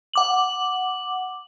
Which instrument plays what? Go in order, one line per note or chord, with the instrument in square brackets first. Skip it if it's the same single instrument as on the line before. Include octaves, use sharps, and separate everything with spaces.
[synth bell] F#5 D6 F#7